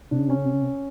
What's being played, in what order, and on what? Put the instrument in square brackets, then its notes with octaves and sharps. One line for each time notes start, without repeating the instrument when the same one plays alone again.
[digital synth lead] C3 [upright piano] D4
[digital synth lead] C#3
[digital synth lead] C3 [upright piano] C#4
[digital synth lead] C#3
C3
C#3
C3